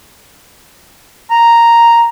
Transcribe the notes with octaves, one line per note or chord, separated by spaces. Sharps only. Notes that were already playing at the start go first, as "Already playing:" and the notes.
A#5